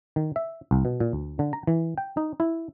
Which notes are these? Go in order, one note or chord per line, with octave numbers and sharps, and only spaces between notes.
D#3
E5
C2
B2
A#2
D2
D3
A#5
E3
G5
D#4
E4